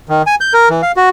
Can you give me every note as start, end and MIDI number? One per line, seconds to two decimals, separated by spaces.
0.09 0.22 51
0.27 0.35 80
0.41 0.53 91
0.54 0.69 70
0.70 0.82 52
0.83 0.92 77
0.97 1.09 66